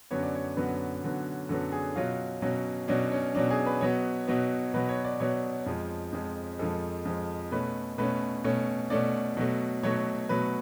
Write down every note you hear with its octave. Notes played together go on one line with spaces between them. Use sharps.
F#2 D3 F#3 B3 C#5
D5
C#5
F#2 D3 F#3 B3 B4
F#2 D3 F#3 B3
F#2 D3 F#3 B3 A4
G#4
B2 F#3 C#4 F4
B2 F#3 C#4
B2 F#3 C#4 D4
C#4
B2 F#3 C#4 D4
G#4
B4
B2 F#3 B3 C#5
B2 F#3 B3
B2 F#3 B3 B4
C#5
D5
B2 F#3 B3 C#5
F2 F3 G#3
F2 F3 G#3
F2 F3 G#3 A4
F2 F3 G#3
B2 A3 C#4 B4
B2 A3 C#4 B4
B2 A3 C#4
B2 A3 C#4 D5
B2 F#3 A3
B2 F#3 A3 C#5
B2 F#3 A3 B4